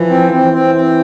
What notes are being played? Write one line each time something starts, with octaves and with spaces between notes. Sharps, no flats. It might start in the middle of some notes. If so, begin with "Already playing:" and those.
Already playing: E3 F3
C4
E3 C4
C4
C4